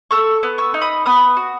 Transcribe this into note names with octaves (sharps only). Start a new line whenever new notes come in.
A4 C#6 E6
B3
C#6 E6
D#4
B5 D#6
B3 B5 D#6
F#4